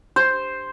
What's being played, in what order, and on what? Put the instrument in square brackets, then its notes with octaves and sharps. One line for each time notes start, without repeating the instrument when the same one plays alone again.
[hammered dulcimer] C5